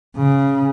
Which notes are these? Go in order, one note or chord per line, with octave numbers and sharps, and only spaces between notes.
C#3